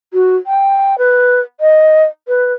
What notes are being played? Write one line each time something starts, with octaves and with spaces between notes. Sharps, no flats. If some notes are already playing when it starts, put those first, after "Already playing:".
F#4
G5
B4
D#5
B4